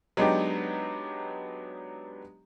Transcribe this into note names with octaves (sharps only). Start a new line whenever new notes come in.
F#3 G#3 B3 D4 D#4 G4